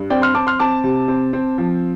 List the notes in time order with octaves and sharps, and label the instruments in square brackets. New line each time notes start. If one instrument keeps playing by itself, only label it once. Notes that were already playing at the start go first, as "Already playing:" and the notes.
Already playing: [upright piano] G2
C4 D5 G5
C6 F6
C4 A5 D6
C6 F6
C4 A5 D6
C3
C4
C4
F3